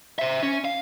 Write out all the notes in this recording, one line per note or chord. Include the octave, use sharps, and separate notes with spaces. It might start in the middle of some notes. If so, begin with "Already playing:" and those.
C5 E5
C#4
F5